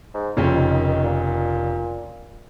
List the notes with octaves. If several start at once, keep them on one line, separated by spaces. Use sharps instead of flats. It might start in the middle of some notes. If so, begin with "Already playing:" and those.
G#2
F1 F2 A#2 C#3 F3 C#4
D#3
D#3
D#3
A#2